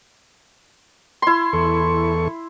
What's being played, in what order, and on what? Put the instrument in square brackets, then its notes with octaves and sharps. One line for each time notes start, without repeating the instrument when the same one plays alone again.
[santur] E4 C6
[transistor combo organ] E2 A4 C#6